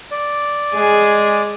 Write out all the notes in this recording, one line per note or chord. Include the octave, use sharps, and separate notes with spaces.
D5
G#3 G#4